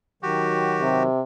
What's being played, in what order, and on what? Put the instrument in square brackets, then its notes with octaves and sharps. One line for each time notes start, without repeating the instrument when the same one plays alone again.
[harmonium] D#3 F#3 [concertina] F#4 G4
[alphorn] C3